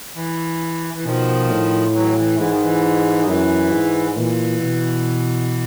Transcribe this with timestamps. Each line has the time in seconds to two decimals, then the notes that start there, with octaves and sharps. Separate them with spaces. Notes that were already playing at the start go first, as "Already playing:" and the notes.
0.15 E3
0.94 E3
1.04 B2 D#3 F3
1.49 A2
1.94 E3 F#3
2.16 E3
2.37 G#2 E3
2.50 D#3
2.62 E3
3.19 D#3
3.27 F#2 E3
3.72 G#2
4.16 A#2 E3
4.60 B2